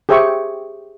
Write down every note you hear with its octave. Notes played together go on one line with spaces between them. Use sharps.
G4 G#4 C5 E5 G5 C#6